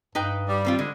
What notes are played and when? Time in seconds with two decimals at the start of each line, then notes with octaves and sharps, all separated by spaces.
0.15 G2 D#4 B4 G5
0.48 G3
0.65 D#3 C4 F4
0.79 D3 G#3